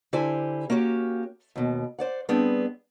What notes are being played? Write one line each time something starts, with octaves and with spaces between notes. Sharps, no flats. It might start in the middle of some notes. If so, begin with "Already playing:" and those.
D3 E4 G4 C5 G#5
A#3 C#4 F#4 G4
D#2 B2
C5 D5 F#5
G3 B3 C4 D4 G#4